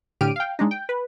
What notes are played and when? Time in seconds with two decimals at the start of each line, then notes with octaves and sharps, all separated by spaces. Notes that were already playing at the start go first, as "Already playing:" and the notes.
0.21 A2 D3 G4 F6 D7 D#7
0.36 F5 G5
0.59 G#3 D4 D#4
0.71 G5
0.89 B4